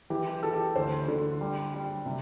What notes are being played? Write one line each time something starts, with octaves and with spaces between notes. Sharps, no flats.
E3 G4
E3 A4
G4
D2 C5
D3
G3
G3
C3